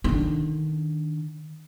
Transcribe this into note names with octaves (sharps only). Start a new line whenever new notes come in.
D3 D#3